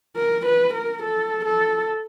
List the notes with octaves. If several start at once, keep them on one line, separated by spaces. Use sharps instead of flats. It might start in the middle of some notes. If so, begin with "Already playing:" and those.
A#4
B4
A#4
A4
A4